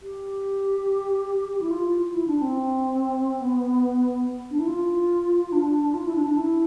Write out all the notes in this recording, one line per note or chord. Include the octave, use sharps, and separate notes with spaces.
G4
E4
F4
E4
D4
C4
B3
D4
E4
F4
D4
F4
E4
D4
D4
E4